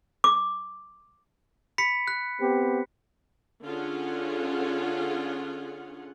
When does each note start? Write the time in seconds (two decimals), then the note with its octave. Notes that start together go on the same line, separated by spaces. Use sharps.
0.24 D6
1.78 B5 B6 C#7
2.08 F#6
2.40 B3 C4 G4
3.64 D3 C#4 F4 G#4 F#5